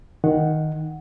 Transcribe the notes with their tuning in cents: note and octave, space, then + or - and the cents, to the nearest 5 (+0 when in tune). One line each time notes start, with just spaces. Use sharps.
D#3 +0 F#5 -5